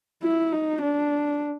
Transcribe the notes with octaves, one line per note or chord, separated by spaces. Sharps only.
E4
D#4
D4